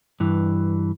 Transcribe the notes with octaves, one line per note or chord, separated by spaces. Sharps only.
G2 E3